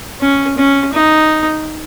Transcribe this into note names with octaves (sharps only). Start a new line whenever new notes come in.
C#4
C#4
D#4